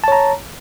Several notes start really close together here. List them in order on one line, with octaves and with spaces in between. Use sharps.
A5 C#5 A#5